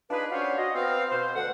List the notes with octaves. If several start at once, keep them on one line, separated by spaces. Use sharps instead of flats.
D4 D#4 F4 G#4 B4
C#4 D4 F#4 C5 C#5 F5
F#4 D#5
B3 C4 F5
B2 C5
D2 F#5